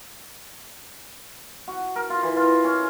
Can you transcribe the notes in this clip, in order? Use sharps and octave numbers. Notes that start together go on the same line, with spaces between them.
F#4
A#4
F4
E3
F4
C#4